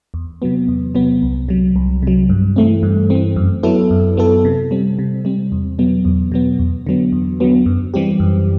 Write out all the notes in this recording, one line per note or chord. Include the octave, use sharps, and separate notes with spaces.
E2
C3 F#3 B3
E2
C3 F#3 B3
C2
C3 F#3
C2
C3 F#3
G2
E3 A3 C4
G2
E3 A3 C4
F#2
F#3 B3 E4 A4
F#2
F#3 B3 E4 A4
C3
G3 C4
C3
G3 C4
E2
B2 F#3 B3
E2
B2 F#3 B3
E2
D3 F#3 B3
E2
D3 F#3 B3
F#2
E3 G3 C4 G4
F#2